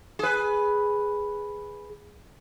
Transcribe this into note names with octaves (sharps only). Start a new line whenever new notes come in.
G#4 B4